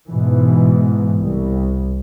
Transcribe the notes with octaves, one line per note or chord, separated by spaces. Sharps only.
G#2 B2 E3
C2